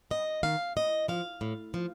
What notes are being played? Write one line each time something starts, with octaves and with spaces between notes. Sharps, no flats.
G2 D#5
D#3 F5
A2 D#5
F3 F5
A2
F3